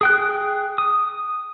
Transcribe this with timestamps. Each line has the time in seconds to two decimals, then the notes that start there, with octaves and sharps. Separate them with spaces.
0.01 G#4 G5 F#6
0.78 D#6